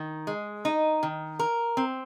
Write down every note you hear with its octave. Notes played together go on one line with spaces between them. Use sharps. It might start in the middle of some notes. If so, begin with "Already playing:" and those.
Already playing: D#3
G#3
D#4
D#3
A#4
C4